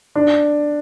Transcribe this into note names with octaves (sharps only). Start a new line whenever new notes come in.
D4